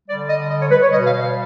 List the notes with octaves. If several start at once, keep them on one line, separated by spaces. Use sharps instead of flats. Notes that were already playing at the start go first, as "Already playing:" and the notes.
D3 G3 D5
D#5
D#5
C#5
B4
C#5
B2 G3 D#5
F5
F5